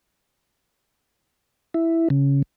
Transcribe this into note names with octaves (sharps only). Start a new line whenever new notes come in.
E4
C#3